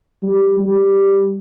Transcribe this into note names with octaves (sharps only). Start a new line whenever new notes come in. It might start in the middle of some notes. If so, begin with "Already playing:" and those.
G3
G3